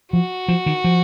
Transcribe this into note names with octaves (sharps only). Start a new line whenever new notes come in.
F3 F#4
F3
D#3
F3